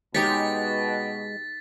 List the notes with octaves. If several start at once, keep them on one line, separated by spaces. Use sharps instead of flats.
B2 G#3 D#4 G4 C#5 A6 B6